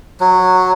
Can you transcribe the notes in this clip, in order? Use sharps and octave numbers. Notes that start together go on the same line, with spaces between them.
F#3